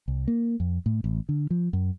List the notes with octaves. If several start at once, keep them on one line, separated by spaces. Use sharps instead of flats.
C2
A#3
F2
A2
A1
D3
F3
F#2